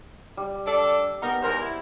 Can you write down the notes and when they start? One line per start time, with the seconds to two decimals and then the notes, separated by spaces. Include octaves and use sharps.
0.37 G3
0.67 D4 A4 D5
1.22 B3 D#4 A#4
1.42 E2 G#2 A#4 C5
1.61 E4